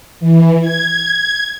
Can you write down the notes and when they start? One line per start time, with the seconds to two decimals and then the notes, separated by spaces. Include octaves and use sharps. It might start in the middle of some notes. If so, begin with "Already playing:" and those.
0.20 E3
0.61 G#6